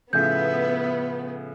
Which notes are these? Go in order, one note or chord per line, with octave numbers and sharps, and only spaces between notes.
A2 C#3 F3 B3 E5 G6